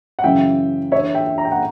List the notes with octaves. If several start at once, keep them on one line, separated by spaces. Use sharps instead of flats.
F#5
F#2 C#3 E3 E5 G5
E2 C#5 E5
D3
E5 G5
A#5
G5
F#5 A#5